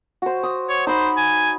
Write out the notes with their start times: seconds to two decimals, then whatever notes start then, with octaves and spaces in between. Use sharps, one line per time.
0.22 F#4 C5
0.43 D#6
0.69 C#5
0.87 D#4 C5 B5
1.17 G#5